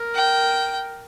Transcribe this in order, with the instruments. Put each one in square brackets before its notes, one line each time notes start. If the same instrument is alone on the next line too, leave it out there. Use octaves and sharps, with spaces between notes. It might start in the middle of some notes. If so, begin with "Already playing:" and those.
Already playing: [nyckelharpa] A#4
[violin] G5